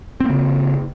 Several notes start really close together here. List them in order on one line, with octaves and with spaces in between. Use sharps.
C4 A#3 C#3